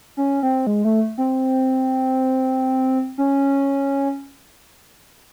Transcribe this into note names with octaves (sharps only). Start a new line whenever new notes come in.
C#4
C4
G#3
A3
C4
C#4